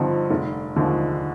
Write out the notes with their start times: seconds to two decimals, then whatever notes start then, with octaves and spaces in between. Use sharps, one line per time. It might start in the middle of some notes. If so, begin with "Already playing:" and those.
Already playing: G2 D3 F3 C4 D#4
0.31 F1
0.76 D#2 D3 F3 G#3